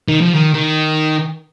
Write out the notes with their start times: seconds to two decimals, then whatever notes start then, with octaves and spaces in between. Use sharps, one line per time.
0.08 D#3
0.21 F3
0.34 D#3
0.54 D#3